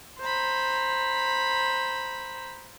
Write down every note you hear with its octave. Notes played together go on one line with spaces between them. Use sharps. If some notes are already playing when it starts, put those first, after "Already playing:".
C5 A#5 B5